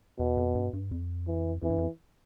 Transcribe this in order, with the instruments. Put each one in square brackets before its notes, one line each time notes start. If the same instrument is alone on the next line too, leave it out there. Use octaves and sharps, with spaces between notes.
[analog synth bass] E2 [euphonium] B2
[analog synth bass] F2
G2
G2
F2
[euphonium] E3
[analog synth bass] F2 [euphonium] E3
[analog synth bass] G2
F2